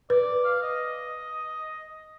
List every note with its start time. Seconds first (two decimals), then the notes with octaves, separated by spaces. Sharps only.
0.10 B4 D5
0.44 F5
0.62 D#5